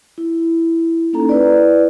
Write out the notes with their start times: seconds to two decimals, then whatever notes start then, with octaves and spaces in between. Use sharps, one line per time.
0.18 E4
1.13 A#3 C#4 D#4 A4 A#5
1.29 E4 B4 D5